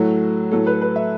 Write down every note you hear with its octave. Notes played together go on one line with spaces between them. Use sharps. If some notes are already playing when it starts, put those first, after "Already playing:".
Already playing: A2 F#3 A3 F#4
A2 F#3 A3 A4
B4
B4
E5